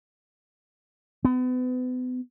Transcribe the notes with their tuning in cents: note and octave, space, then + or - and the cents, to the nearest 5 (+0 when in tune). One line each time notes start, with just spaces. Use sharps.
B3 +35